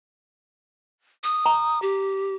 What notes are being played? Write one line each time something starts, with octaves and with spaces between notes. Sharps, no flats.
D#6
A#5
G4